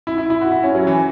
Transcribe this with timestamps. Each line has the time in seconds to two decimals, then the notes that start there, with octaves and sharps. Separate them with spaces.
0.07 E4
0.18 E4
0.30 E4
0.41 F#4
0.52 E4
0.63 C#4
0.75 F#3
0.87 E3